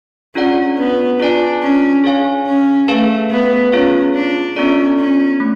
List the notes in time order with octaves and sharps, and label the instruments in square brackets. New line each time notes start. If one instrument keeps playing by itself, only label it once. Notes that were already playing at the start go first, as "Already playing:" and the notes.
[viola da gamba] C#4 [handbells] D4 F4 G#4 D5 F#5
[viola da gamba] B3
[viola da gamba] D4 [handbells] F4 G#4 D5 G#5
[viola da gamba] C#4
[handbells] G#4 C#5 F5 G#5
[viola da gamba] C#4
[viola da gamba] A3 [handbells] G#4 B4 F5 A5
[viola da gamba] B3
[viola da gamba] C#4 [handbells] F4 G#4 C#5 F5
[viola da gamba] D4
[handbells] B3 F4 A4 D5 [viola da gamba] C#4
[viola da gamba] C#4
[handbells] A3